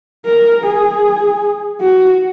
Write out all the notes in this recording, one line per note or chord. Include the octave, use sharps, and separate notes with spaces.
A#4
G#4
F#4